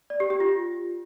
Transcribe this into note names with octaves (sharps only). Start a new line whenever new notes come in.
D5
G4
G4
F4